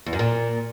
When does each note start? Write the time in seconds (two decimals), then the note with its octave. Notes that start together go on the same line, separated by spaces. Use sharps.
0.06 E2
0.13 F#2
0.19 A#2